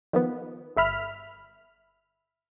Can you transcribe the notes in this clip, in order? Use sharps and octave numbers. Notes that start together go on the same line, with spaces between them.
D#3 F3 B3
G1 E5 B5 F6